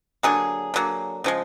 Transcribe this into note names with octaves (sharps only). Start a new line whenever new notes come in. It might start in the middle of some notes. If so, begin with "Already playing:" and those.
D3 F#3 A#3 G#4
D3 F#3 A#3
C#3 F3 G#3